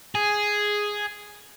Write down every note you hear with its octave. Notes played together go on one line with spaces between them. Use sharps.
G#4